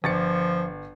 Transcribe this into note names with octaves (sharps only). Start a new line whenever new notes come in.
G1 F3 A6 C#7